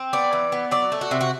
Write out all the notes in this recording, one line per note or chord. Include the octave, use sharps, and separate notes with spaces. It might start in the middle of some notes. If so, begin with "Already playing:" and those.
Already playing: C4
B3 D5
E3
B3
F#3 D5
A3
F#4
C3
F#4